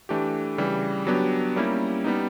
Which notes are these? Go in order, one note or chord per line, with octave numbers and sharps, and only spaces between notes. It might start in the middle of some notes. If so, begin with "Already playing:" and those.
E3 A3 D4 G4
C#3 E3 G3
F#3 B3 D4 G4
G3 A#3 C#4 E4 G4
G3 B3 D#4